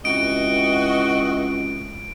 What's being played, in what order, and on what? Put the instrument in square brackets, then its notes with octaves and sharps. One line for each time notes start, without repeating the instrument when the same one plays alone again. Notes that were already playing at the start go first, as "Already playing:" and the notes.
[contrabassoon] C#2 [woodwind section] E3 C4 [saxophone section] F#4 D#5 [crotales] D7